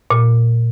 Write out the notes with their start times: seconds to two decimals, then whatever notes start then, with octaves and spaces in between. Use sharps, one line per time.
0.10 A#2